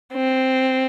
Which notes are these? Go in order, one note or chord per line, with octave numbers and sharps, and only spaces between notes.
C4